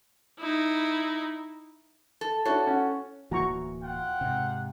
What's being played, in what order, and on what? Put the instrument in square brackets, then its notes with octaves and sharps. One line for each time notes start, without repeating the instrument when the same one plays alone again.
[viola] D#4 E4
[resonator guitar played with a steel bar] A4
[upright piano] D4 E4 C#5 [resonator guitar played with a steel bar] F#4 A4
[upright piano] C#4 F#5
[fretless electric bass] D1 E3 A#3 [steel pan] F#4 A#5 C#6
[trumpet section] F4 F#5 G5
[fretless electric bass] G#2 C3